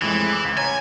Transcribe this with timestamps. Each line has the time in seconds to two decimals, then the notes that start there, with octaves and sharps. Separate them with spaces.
0.02 F2 A2 E3 G#3
0.32 D6
0.45 C#2
0.58 C#5 G#5 A#5